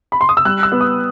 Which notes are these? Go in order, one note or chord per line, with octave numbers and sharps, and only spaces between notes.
B5
C6
D#6
E6
G3 F#6
E6
B3
D#6